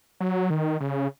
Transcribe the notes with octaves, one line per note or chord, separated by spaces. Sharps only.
F#3
D#3
C#3